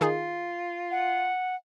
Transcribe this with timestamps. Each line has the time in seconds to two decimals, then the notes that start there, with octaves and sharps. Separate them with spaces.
0.01 D#3 D#4 F4 G#4
0.91 F#5